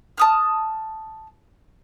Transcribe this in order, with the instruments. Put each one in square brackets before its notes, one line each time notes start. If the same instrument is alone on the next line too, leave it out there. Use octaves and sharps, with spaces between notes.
[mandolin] A5 D#6 F6